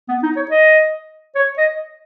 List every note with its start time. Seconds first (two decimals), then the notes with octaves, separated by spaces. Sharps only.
0.09 B3
0.23 D#4
0.36 C#5
0.51 D#5
1.36 C#5
1.58 D#5